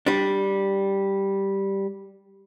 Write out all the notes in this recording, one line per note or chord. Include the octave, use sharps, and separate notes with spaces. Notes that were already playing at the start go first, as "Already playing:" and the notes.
G3 D4